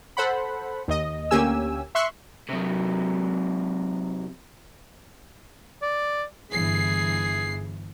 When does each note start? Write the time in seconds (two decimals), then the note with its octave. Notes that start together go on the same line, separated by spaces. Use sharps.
0.17 A4 C5 F#5 B5
0.88 D#2 D#5
1.31 D2 A#3 C#4 G4 G#5 E6
1.95 E5 C6 C#6 F#6
2.49 C3 F#3
5.82 D5
6.51 G1 E3 G#4 C7